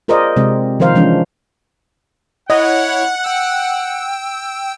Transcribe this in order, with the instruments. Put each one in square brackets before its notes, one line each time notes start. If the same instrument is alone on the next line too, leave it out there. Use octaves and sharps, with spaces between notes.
[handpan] F4 G#4 A#4 C5 D5 D#5
C3 G#3 C4
D#3 F3 A#4 C5 F5
E3 F3 G#3 C#4 D4
[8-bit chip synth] E4 C#5 [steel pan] D#5 [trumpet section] F#5
[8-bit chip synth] G5 E6